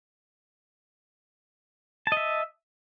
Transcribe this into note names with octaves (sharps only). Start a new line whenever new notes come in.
D#5 E5 A5